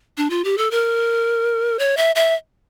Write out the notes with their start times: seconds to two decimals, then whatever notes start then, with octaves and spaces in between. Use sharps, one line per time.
0.17 D4
0.30 F4
0.45 G4
0.58 A4
0.71 A#4
1.79 C#5
1.97 E5
2.15 E5